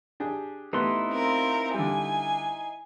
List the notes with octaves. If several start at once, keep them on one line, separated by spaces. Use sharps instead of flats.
D4 G4 G#4
A3 B3 D#4 E4 G4 C6
C4 F4 A#4
D3 G3 G#5